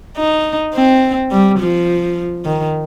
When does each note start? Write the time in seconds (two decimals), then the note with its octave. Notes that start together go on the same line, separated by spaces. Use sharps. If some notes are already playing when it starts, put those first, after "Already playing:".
0.17 D#4
0.75 C4
1.31 G3
1.59 F3
2.45 D#3